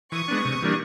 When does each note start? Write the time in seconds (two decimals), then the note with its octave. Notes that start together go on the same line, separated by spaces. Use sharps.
0.12 E3 C#6 D#6
0.28 G#3 B3 D4
0.45 C3
0.62 E3 G3 A#3 D4